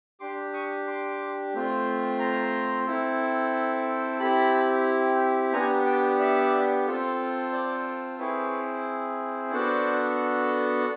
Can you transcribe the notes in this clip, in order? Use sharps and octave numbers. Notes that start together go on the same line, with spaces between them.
D4 G4 C6 D6
C#6 D#6
C6 D6
A3 C4 F4
A#5 C6
C4 E4 A4
C4 E4 G4 A5 B5
B3 D4 G4 G#5 A#5
G5 A5
D5 E5
C4 F4 A4
C5 D5
C4 E4 G#4 B4 C#5
B3 D4 F#4 A4 C5 D5